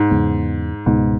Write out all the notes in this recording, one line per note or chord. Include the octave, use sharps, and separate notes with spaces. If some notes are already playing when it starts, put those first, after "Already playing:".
Already playing: G#2
E2 C#3 G#3 B3
C#2 G#2 B2 G#3 B3